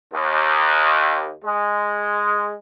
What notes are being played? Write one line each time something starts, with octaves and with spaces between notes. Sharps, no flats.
D#2
G#3